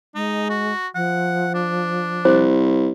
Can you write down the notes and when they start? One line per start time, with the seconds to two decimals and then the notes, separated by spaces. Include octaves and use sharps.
0.15 G#3 D#4
0.49 F#4
0.95 F3 F#5
1.55 D4
2.25 C2 C5